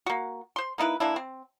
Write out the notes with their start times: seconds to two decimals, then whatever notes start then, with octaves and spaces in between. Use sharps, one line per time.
0.06 A#3 F#4
0.56 C5 C6
0.78 A#3 D#4 E4 B4
1.00 E3 A#3 D4 E4
1.16 C4